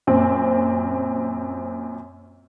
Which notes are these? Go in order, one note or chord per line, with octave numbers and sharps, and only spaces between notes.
F#2 A#2 C4